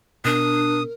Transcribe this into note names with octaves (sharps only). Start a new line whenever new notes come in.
B2 D4 A#4 D#6